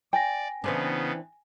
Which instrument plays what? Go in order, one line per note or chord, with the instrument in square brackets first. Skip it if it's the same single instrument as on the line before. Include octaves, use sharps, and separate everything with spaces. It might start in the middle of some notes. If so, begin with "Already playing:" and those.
[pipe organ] D5 [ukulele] G5 [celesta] G#5 A#6
[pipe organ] C#3 B3 [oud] E3 C4 D4